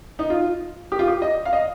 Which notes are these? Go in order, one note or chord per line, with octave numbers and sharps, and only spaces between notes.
D#4
F4
G4
F4
G4
D#5
F5
D#5